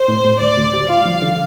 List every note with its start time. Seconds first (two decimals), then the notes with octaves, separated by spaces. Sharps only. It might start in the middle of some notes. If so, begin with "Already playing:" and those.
Already playing: C5
0.08 A2
0.25 A2
0.41 D2 D5
0.57 D2
0.73 G3
0.89 F4 F5
1.06 F3
1.22 D3